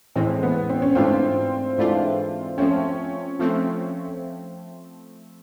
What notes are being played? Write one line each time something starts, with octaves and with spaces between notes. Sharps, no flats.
A2 E3 G#3 C4
B3
C4
C#4
G#2 E3 A3 C4 D4 F4
G#2 E3 A3 D4 F4
F3 A3 C4 C#4
F3 A3 C4